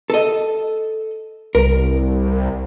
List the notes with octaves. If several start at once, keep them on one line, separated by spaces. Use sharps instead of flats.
A4 D#5
C2 A#4